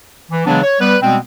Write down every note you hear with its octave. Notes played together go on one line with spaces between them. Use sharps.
E3
C#3 E3 F#3 G#3 B3 D4
C#5
G3 B3 B4
B2 G3 G#3 B3 C4